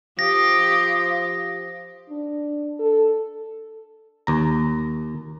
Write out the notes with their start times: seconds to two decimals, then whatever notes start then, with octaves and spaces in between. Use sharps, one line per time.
0.19 F3 G4 F5 D#6 A#6
2.10 D4
2.80 A4
4.27 D#2 A#5